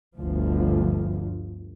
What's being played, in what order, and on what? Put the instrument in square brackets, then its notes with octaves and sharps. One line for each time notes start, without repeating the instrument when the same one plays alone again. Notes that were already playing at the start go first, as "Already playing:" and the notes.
[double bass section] G1 D2 F3